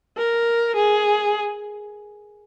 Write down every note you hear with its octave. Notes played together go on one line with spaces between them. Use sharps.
A#4
G#4